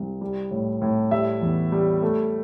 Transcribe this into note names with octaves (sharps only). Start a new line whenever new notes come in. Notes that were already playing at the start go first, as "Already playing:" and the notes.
Already playing: C2
G3
A2
A2
G3 E5
E2
G3
A3